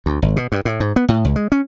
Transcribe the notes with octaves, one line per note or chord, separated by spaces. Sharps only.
D2
G#1
B2
G2
A2
G#2
B3
A2
C#2
G#3
C#4